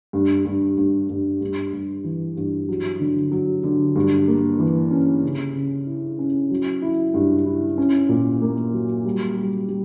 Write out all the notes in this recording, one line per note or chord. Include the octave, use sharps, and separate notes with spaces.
G2
G2
G2
G2
G2
G2
E3
G2
F#3
D3
F#3
D3
G2
A#3
E3
C#4
C#3
C#3
E4
C#4
F#3
E4
G2
E4
C#4
A#2
A#3
F#3
G3
G3
G3